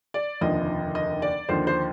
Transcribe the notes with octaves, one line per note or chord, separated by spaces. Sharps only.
D5
F1 D#2 D3 F3 D#5
D#5
D5
D#2 D3 F3 C5
C5